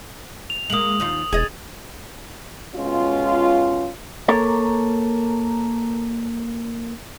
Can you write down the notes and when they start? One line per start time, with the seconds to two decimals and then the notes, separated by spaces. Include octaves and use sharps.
0.50 F7
0.70 G#3 A#3 D#6 F#7
1.00 D#2 D#4 F4
1.33 E1 G#4 D#5 G#6 A6
2.75 B2 G#3 C#4 F4
4.28 A#3 A4 A#4 C#5